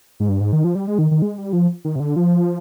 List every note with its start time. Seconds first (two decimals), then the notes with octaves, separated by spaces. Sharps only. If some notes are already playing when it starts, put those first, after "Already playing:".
0.20 G#2
0.29 G2
0.40 G#2
0.53 D#3
0.64 F3
0.75 G3
0.87 G#3
0.99 D#3
1.11 D#3
1.22 G#3
1.38 G3
1.53 F3
1.85 D#3
1.96 C3
2.00 D3
2.16 F3